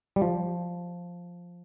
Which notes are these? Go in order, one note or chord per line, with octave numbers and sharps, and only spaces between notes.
G3
F3